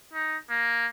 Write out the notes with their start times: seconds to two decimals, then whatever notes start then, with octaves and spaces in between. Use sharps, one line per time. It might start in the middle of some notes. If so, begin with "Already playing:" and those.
0.13 D#4
0.50 A#3